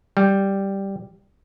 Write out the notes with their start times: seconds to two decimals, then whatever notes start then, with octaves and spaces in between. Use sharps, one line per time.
0.17 G3